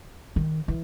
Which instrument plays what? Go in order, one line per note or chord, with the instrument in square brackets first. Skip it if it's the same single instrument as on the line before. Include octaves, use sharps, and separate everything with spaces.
[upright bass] D#3
E3